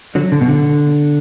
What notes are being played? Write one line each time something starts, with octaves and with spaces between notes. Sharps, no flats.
D3 F#3
D3
B2
D3